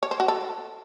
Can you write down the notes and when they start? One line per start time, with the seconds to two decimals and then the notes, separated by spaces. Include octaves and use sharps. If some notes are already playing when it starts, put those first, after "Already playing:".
0.03 C#5
0.11 C5
0.20 F#4
0.28 A4